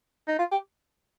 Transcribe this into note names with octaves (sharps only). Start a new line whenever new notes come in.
D#4
F4
G4